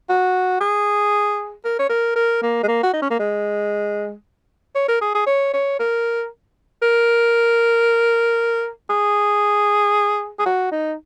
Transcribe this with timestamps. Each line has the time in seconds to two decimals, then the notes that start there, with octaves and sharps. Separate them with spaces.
0.09 F#4
0.60 G#4
1.65 A#4
1.79 C#5
1.89 A#4
2.16 A#4
2.42 A#3
2.63 G#3
2.68 A#3
2.83 F#4
2.93 D#4
3.02 C#4
3.10 A#3
3.20 G#3
4.75 C#5
4.88 A#4
5.01 G#4
5.15 G#4
5.27 C#5
5.53 C#5
5.79 A#4
6.82 A#4
8.90 G#4
10.39 G#4
10.46 F#4
10.72 D#4